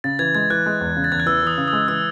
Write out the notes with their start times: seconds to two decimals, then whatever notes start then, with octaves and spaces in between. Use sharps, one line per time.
0.04 C#3 A6
0.19 E3 G#6
0.35 G#3 G#6
0.50 E3 F#6
0.66 G#3
0.81 E2
0.96 C#3
1.04 A6
1.12 E2 G#6
1.20 F#6
1.26 E3 E6
1.42 E3 D#6
1.58 C#3
1.68 D#6
1.73 G#3
1.88 E3 E6